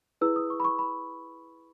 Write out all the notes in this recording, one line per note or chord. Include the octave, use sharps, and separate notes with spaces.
E4 G#4 B4 E6
D#6
C#6
B5
C#6
B5